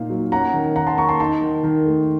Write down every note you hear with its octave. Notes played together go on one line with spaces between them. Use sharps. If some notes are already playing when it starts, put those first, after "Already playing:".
Already playing: A#2 A#3 D#4 F5
F#3
C#4 F#5 A#5
D#3
D#3 F#5 A#5
A5 C6
A#3 A#5 C#6
A5 C6
D#4 A5 C6
D#3
D#3
A3